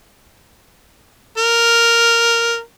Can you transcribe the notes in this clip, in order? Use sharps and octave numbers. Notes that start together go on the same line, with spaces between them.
A#4